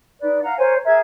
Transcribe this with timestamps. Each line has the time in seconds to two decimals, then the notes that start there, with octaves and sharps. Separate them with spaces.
0.20 D#4 B4 D5
0.42 F5 F#5 A#5
0.57 A#4 C5 C#5 G#5
0.84 G#4 A#4 E5 G#6